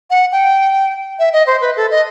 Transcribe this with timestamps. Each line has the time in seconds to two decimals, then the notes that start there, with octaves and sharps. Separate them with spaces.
0.11 F#5
0.32 G5
1.19 E5
1.33 D#5
1.47 C5
1.61 B4
1.77 A4
1.91 D#5